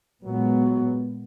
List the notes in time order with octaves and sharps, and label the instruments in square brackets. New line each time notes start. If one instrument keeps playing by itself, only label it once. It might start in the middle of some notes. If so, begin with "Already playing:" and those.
[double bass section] A#2 G#3 B3 [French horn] F#3